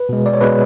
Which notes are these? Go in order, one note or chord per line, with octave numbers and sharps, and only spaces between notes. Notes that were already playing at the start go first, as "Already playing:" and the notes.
Already playing: B4
B2 G#3
D5
C#5
B2 G#3 B4